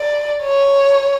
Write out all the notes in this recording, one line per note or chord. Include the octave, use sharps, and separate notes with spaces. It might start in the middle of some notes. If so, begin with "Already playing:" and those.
Already playing: D5
C#5